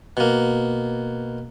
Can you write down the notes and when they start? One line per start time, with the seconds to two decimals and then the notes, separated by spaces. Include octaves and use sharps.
0.17 B2 A#3